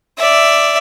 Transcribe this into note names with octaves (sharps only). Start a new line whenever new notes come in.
D5 E5